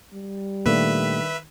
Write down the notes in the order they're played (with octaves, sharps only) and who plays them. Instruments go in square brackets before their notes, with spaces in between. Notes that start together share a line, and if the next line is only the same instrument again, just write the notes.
[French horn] G3
[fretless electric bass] A#2 A3 A#3 [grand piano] D#3 D4 D5 [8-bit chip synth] B4 E5